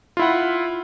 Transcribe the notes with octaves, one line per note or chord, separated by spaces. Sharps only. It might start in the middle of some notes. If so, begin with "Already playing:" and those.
E4 F4 F#5